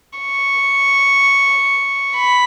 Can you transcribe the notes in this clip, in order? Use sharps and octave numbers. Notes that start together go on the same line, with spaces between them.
C#6
B5